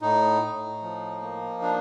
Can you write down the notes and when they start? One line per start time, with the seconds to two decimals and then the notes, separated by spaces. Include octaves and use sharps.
0.02 A2 D#4
0.41 A2
0.82 F3
1.22 A#3
1.62 D4